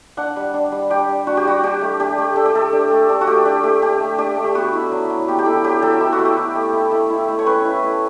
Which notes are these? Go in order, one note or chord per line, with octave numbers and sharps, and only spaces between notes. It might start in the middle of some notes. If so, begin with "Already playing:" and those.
D4 F#5
G3
D4
G3
D4 G4
G3
D4 F#4
G4
G3 F#4
D4 G4
A3
D4 G4
A3
D4 A4
G4
A3 A4
D4
A3
D4 A4
F#4
A3 G4
D4 G4
A3 G4
D4 G4
A3
D4 G4
A3
G4
B3 F#4
E4
F#3
F#3
B3 G4
G4
E4 A4
F#3 G4
F#3 A4
E4 G4
F#4
A3
G4
E4
A3
E4
A3
E4
A3
C#5
C#4 B4
E4
A3